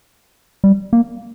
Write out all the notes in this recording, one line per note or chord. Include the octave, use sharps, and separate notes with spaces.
G3
A#3